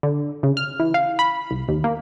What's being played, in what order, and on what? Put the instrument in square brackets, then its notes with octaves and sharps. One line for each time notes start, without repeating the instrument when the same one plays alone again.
[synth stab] D3
C#3
F6
E3
F5
B5
C2
D#2
A#3